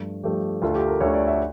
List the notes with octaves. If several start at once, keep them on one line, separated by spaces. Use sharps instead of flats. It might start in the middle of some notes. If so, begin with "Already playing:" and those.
Already playing: G2 F3 A3
G2 F3 A3 G4
D2 D3 A3 F4
G4
A#4
D2 D3 A3 C#5
D5
E5